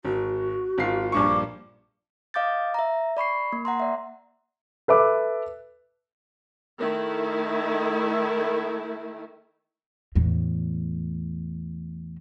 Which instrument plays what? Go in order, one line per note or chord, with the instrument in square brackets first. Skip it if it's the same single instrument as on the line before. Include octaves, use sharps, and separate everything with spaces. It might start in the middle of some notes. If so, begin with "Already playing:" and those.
[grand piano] G#1 [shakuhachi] F#4
[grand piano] G#1 F4 C7
[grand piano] A#1 G2 C#6 [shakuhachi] D6
[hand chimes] D#5 F5 D6 G6 A6
E5 A#5
D5 B5 C#6 C7
A#3
F#5 A#5 C6
D5 E5
[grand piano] A4 B4 E5 D6
[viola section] D#3 A3 E4
[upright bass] E2 A2